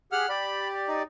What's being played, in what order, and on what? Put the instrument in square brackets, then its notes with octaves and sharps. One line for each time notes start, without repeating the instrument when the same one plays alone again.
[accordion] G4 G#4 [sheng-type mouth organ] F#5 F6
[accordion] G4 D5 [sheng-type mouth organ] B5
[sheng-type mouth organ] D#4